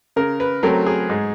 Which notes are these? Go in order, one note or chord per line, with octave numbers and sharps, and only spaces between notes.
C#3 A#4
B4
F#3 A3 C4 A#4
G#4
G#2